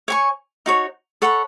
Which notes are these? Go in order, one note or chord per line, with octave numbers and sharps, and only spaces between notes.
C#5 G#5 C#6
D#4 F#4 C#5
A4 C#5 F#5 B5